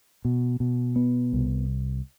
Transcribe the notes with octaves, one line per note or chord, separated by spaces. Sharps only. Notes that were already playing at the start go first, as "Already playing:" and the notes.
B2
B2
B3
C2